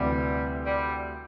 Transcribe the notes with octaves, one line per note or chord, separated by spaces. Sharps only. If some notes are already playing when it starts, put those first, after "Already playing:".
Already playing: D2 C3 E3 G3
G3